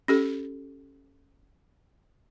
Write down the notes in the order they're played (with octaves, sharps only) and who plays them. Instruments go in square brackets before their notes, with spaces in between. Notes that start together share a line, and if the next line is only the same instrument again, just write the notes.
[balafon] C#4 G4 A4